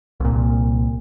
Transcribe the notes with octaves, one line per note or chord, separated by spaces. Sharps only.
C2 A#2